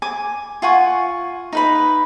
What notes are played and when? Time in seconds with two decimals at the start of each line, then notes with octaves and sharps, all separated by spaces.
0.02 G#5 D6
0.62 F4 F#5 G#5 C#6
1.53 D#4 B4 B5